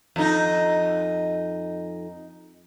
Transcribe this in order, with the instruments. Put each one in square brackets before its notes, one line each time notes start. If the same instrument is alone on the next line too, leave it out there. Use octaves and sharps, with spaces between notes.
[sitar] F2 D#4